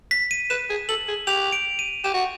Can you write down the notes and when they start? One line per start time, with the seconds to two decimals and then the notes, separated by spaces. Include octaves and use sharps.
0.11 B6
0.31 D#7
0.50 B4 E7
0.70 G#4
0.89 A4 F#7
1.08 G#4
1.27 G4 F7
1.52 D7
1.79 D#7
2.04 G4 E7
2.14 F#4